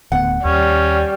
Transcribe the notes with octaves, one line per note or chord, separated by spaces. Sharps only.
D1 D2 B3 F#5
D#2 G3 C#4